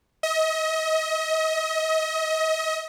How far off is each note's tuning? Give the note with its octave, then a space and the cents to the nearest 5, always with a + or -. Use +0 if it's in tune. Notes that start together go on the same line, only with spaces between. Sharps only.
D#5 +35